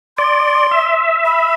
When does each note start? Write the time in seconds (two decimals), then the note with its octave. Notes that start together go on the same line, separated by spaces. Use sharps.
0.18 D5 C6
0.71 E5
1.25 B5